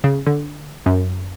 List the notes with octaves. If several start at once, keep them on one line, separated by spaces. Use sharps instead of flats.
C#3
D3
F#2